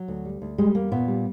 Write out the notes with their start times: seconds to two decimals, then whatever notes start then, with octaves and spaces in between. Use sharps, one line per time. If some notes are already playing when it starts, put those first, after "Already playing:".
Already playing: F#3
0.08 D2
0.25 G3
0.42 D2
0.58 G3 G#3
0.75 E2 A#3
0.91 A#2 B3
1.08 G3